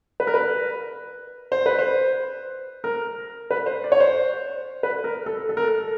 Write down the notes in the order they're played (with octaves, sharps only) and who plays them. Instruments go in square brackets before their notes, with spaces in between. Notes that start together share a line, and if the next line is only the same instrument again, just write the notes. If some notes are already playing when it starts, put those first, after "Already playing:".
[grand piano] B4
A#4
B4
C5
B4
C5
A#4
B4
C5
D5
C#5
C5
B4
A#4
A4
A4
A#4
A4